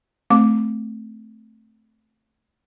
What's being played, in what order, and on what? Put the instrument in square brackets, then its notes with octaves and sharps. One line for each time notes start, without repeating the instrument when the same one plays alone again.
[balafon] A3 C4 D6